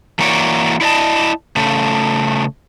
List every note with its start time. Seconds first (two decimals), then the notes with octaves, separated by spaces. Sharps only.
0.19 E3 A#3 F#4 C#5 D5
0.81 E4 D5 D#5 A5
1.56 C#3 A3